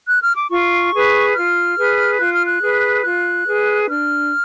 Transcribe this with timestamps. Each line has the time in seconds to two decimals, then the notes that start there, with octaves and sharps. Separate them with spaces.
0.08 F#6
0.22 F6
0.36 D6
0.50 F4 C#6
0.93 G#4 B4
1.35 F4 F6
1.78 G#4 B4
2.19 F4 F#6
2.33 F6
2.47 F#6
2.62 G#4 B4
3.04 F4 F#6
3.47 G#4 B4
3.88 D4 F6